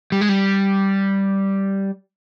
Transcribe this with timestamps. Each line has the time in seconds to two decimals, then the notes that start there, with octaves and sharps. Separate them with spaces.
0.12 G3
0.21 G#3
0.29 G3